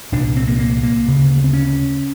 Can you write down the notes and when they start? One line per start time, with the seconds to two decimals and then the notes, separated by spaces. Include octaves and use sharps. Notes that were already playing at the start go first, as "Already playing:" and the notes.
0.12 C2 A#2 D4
0.37 C4
0.48 A#3
0.59 A#3
0.83 A#3
1.07 D2 C#3
1.44 C4
1.53 C#4